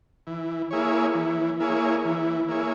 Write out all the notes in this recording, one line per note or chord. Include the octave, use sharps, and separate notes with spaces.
E3
A#3 E4 G#4 C#5
E3
A#3 E4 G#4 C#5
E3
A#3 E4 G#4 C#5